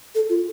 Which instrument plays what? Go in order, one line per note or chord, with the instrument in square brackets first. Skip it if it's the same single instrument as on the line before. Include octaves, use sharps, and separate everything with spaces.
[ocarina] A4
F4